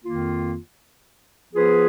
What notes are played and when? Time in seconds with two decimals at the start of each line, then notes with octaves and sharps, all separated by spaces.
0.04 F2 D#3 A#3 F4
1.53 F3 B3 F4 G#4 B4